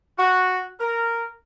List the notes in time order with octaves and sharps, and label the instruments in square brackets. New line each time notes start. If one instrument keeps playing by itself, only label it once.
[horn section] F#4
A#4